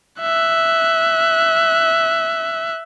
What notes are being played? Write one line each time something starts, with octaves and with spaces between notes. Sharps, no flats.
E5 F#6